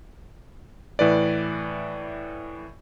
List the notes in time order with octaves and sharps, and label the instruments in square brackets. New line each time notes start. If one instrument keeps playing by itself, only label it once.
[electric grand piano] A2 E3 B4 D5